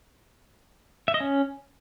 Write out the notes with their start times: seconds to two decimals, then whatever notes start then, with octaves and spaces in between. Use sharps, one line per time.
1.08 E5
1.14 D#5
1.20 C#4